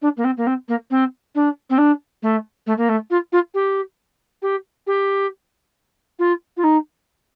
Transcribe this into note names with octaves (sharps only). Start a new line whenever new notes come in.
D4
A#3
C4
A#3
C4
A#3
C4
D4
C4
D4
A3
A3
A#3
A3
F4
F4
G4
G4
G4
F4
F4
D#4